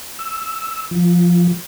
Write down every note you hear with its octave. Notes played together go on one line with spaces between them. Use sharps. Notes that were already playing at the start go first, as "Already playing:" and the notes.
E6
F3